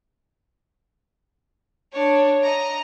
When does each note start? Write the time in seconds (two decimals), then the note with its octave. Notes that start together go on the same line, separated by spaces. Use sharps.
1.92 D4 C#5
2.41 D#5 A#5